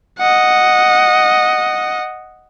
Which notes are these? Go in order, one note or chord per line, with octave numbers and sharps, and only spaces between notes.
D#5 F#5